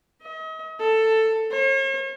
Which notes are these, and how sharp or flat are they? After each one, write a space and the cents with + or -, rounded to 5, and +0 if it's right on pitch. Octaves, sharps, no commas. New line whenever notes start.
D#5 +40
A4 +10
C#5 -45